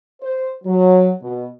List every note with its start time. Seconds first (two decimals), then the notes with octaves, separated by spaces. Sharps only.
0.22 C5
0.65 F#3
1.22 B2